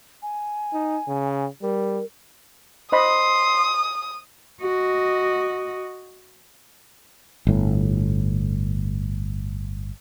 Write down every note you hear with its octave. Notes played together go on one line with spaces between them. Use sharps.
G#5
D#4
C#3
G3 A#4
C5 D#5 B5 C6 D#6
F#4 D#5
G1 A2